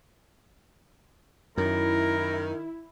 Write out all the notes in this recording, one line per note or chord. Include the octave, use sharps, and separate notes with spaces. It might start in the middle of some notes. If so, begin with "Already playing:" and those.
F#2 D#3 E4 A#4